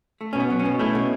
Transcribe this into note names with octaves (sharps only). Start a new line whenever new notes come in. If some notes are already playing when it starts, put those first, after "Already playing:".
A3
B2 C#4
B3
F#3
C#4
B2
A3 C#4 E4
B2